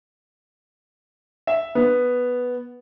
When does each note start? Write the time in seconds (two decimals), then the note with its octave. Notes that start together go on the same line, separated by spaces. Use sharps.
1.47 E5
1.75 B3